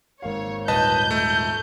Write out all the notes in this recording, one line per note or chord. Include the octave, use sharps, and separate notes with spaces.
G#1 A#3 C#5 F5
D#1 G#1 B4 D#5 A5 G6
A3